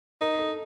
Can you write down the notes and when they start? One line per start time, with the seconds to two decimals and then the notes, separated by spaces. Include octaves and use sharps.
0.21 D#4 A#4
0.39 A4